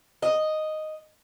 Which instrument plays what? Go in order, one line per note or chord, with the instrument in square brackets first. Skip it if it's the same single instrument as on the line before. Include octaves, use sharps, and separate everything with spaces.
[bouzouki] D#5